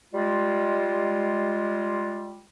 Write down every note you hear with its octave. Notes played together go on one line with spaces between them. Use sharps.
G3 G#3 F4